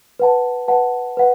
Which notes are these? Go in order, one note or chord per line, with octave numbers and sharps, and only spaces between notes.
B4 F#5 A5
B4 F#5 A5
B4 F#5